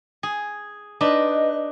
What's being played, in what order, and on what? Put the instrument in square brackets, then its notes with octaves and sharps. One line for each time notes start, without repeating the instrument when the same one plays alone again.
[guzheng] G#4
[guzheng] D4 D#4 B4 [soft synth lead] D#5